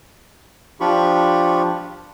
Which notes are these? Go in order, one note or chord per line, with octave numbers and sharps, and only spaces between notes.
F3 D4 F4 G4 B5 C#6